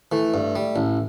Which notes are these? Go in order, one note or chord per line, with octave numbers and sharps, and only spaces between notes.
E3 A3
G2
G3
A1